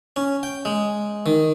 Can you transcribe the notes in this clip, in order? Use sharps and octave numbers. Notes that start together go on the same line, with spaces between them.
C#4
G5
G#3
D#3